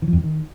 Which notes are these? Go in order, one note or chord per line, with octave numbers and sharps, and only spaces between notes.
D#3
F3
F2
F3
D#3